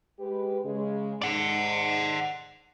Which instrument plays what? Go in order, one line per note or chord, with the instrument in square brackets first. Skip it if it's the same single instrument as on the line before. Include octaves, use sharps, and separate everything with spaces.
[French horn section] G#3 G4 B4
C#3 G#3
[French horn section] G#2 [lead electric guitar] D5 F#5